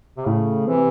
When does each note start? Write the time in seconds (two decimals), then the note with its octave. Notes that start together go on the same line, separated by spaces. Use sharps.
0.17 C3
0.26 A2 C#3
0.67 C3 E3